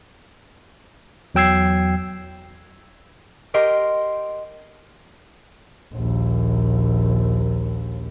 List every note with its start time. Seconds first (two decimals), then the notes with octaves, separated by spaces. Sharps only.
1.35 E2 F#3 G5 E6 G#6 C7
3.54 G4 A#4 D#5 C6
5.93 A#1 D#2